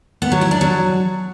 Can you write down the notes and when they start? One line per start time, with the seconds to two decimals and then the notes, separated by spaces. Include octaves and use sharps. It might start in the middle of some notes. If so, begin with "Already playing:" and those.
0.22 B3
0.32 F#3
0.41 E4
0.51 D4
0.61 F#3